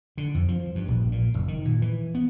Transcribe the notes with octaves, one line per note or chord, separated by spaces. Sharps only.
D3
F2
F3
G2
A#1
A#2
F#1
D#3
A#2
E3
B3